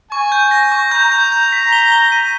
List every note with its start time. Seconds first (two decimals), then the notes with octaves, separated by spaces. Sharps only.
0.11 G#5 C#6
0.32 G6
0.51 A#6
0.72 C#6
0.91 A#5 G6
1.12 G6
1.32 G6
1.52 B6
1.72 G7
1.92 G7
2.12 D#7